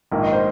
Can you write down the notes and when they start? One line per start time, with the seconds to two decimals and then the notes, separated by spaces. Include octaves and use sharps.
0.11 A#1 G#2 D#3 A#3 F5
0.23 D#5
0.33 C5